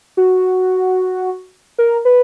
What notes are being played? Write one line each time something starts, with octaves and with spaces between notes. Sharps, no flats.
F#4
A#4
B4